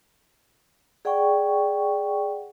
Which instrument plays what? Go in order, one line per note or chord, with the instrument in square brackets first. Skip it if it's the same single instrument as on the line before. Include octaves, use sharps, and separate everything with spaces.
[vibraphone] G#4 D5 F#5 G5 C#6